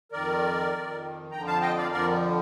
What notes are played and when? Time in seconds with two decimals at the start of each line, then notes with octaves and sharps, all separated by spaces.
0.12 F2 D#3 A#4 D5
0.72 F2 D#3
1.31 F2 D3 F3 G5 A#5
1.46 F5 A5
1.61 D#5 G5
1.77 D5 F5
1.92 F2 D3 F3 A#4 D5